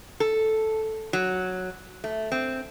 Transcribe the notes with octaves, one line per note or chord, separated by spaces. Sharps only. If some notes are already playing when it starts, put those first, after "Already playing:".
A4
F#3
A3
C4